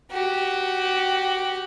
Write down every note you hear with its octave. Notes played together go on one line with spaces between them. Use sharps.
F#4 G4